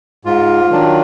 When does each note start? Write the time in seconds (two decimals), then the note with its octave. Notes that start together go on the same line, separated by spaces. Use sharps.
0.25 G#2 F4
0.71 D#3 F#3 D4